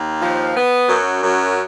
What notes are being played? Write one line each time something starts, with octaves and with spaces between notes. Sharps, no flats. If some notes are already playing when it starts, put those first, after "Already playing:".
Already playing: D#2
F3
B3
F#2
F#2